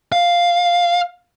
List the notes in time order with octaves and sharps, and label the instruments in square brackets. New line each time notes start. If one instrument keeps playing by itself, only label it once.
[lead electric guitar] F5